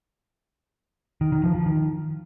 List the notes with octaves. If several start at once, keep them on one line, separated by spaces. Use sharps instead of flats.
D#3
D#3
F3
F3
D#3